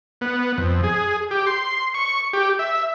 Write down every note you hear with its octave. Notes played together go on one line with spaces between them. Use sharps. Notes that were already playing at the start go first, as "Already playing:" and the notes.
B3
F2
G#4
G4
C6
C#6
G4
E5